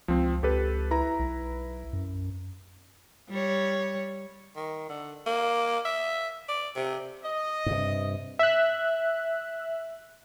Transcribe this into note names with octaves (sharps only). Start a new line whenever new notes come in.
C#2 F3 C4
C#2 G4 A4 B4
E4 B4 A#5
B1
F#2
G3 C#5
D#3
D3
A#3
E5
D5
C3
D#5
G2 C3
E5 F#6